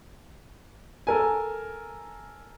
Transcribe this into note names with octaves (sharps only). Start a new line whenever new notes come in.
A4 A#4 G#5